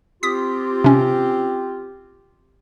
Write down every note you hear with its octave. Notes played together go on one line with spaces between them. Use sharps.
C4 F4 G4 D#6 B6
C3 C#4